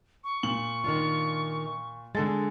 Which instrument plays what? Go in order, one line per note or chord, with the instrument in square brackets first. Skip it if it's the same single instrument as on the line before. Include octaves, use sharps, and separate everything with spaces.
[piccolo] C#6
[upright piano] A#2 F#7
[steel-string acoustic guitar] D#3 D4 F4
[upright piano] D3 A4 A6 [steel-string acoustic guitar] G#3